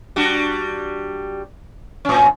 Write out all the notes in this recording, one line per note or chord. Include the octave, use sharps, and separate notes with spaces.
G3 D4 F#4
A2 C#4